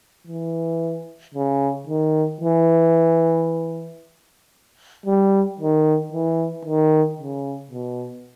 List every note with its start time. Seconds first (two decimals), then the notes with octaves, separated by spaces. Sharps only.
0.27 E3
1.34 C#3
1.87 D#3
2.41 E3
5.06 G3
5.60 D#3
6.12 E3
6.65 D#3
7.19 C#3
7.71 B2